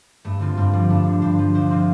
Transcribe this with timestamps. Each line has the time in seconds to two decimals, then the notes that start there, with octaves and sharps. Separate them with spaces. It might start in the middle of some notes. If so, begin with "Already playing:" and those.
0.25 G2 A3
0.40 D3 C4 F4
0.57 G2 G3 C4
0.73 F3 G3 C4
0.89 G2 A3 D4
1.06 D3
1.22 G2 G4 C5
1.39 F3
1.54 D2 G4 C5
1.70 C3 C4 F4